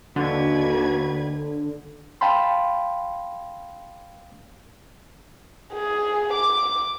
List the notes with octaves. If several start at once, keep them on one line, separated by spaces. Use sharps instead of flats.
D#2 D3 F#4 B4 G#6
F5 G5 A5 B5 C6
G#4
D6